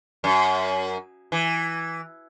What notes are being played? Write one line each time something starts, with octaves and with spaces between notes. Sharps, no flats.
F#2
E3